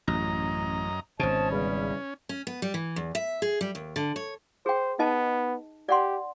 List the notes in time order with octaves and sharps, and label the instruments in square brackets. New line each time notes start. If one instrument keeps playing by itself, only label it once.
[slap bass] A1 [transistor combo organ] F#2 D#5 A#5
[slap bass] G#1 B2 [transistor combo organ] C#4 [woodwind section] C5 D#5 A5
[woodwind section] E2 C#3 G3
[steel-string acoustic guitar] C#4
B3
G3
E3
E2
E5
G#4
G3
D#2
D3
C#5
[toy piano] G#4 G5 [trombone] C5
[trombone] B3 [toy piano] D#4 D#5 A5
[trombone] G4 [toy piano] D5 F#5 C6